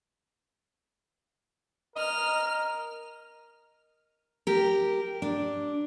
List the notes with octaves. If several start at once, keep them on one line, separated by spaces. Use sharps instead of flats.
A#4 D#5 F6
G4 A#4
D4